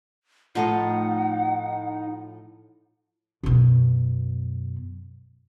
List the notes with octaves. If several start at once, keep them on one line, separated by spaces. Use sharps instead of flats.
A2 F3 D#4 F4 A4 D#5 F#5
F#2 B2